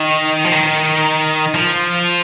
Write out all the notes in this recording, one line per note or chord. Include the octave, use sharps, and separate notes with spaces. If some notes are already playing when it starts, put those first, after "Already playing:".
Already playing: D#3
F3
D#3
F3